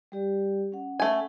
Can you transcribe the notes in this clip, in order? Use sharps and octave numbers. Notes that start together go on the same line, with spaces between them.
G3 G4 D5
C#4 F#5
A3 G#5